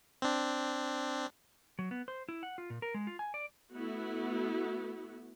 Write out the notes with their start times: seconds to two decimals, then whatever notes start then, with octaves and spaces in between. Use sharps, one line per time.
0.22 C4 D4
1.79 F#3
1.91 B3
2.08 C5
2.29 E4
2.43 F#5
2.58 F4
2.70 A#2
2.82 A#4
2.94 G#3
3.07 F4
3.19 G#5
3.34 D5
3.74 A3 B3 E4 F#4